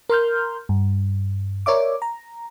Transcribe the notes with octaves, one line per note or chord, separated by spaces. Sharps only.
A#4 C6 F6 G6
G2
A#4 C#5 D5 E5 D6
A#5